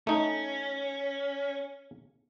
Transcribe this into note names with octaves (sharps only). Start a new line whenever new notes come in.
A3 C#4 D#4